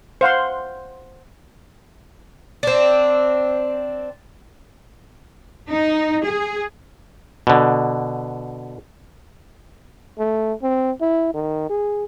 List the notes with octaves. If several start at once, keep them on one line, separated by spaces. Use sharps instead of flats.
C5 F5 F#5 C6
C4 D4
D#4
G#4
B2 D3
A3
C4
E4
D#3
G#4